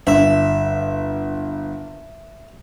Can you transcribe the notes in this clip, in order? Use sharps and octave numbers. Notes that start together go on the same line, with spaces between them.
G1 E5